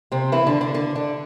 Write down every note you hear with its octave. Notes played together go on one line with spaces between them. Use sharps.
C3 C4
E3 E4
D3 D4
D3 D4
D3 D4
D3 D4